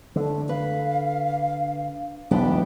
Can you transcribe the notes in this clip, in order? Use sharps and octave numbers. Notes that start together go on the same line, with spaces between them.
D3 A3
B4 F5
E1 B1 E3 B3 D4 G4